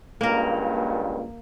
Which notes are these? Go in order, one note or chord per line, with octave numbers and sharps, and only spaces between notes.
C#2 G2 A#2 A#3 A#4